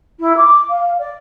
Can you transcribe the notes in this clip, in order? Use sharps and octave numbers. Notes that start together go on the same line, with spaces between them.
E4
D6
F5
D5